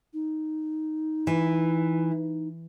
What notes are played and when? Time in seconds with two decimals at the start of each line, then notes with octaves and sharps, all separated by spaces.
0.13 D#4
1.27 E3